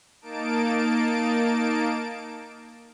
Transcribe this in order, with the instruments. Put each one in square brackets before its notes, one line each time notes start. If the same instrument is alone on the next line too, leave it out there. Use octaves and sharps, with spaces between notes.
[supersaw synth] A#3 D#4 A5 D7